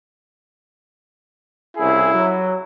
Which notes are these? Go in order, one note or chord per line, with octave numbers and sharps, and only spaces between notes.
C2 C#3 E4 G#4
F#3